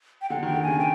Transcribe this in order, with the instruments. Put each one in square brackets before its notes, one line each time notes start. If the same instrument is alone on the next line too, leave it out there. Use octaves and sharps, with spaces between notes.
[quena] G5
[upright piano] D3 [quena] F#5
[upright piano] D#3 [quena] G5
[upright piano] D3
[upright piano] C#3 [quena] G#5
[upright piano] C3 [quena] G5